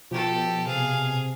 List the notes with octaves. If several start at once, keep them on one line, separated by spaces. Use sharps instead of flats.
B2 F3 G4 A4
C3 G#4 F5